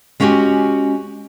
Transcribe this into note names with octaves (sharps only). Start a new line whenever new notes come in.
G#3 C#4 E4 F#4 G4 G#5